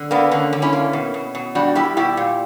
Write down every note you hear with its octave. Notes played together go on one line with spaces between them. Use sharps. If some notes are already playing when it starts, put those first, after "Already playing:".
Already playing: D3
A#3 B3 D4
D3 C#4
D3
C#4 E4
A#3
B2
B2
B2
G3 D4 F#4
G3 E4 G4
B2 E4 G4
A#2